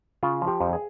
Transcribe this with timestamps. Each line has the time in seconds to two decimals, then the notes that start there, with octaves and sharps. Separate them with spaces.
0.23 C#3 F4
0.42 F3
0.47 G4
0.61 F2
0.73 G#4